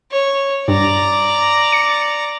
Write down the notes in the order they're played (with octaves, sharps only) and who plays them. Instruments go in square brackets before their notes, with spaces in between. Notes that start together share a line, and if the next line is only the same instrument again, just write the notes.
[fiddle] C#5
[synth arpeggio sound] G2 [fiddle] D5 A#5
[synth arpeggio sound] C#7